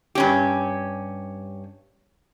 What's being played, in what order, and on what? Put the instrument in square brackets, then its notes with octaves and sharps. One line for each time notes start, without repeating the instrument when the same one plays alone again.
[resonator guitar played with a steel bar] G2 C#4 G4